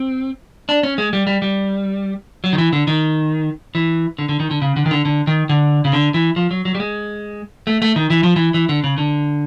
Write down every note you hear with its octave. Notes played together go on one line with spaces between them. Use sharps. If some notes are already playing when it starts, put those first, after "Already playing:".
Already playing: C4
D4
C#4
G#3
G3
G3
G3
F#3
D#3
E3
D3
D#3
E3
D3
D3
D#3
D3
C#3
D3
D#3
D3
D3
D#3
D3
C#3
D3
E3
F3
F#3
F#3
G3
G#3
A3
A3
D#3
E3
F3
E3
E3
D3
C#3
D3